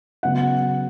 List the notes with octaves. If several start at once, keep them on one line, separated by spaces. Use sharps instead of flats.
C#3 F#3 B3 F#5